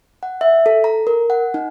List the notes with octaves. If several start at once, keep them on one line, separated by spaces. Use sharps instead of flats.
F#5
E5
A4
A#5
A#4
F#5
D#4